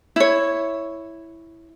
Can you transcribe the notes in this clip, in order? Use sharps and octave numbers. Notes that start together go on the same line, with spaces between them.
E4 C#5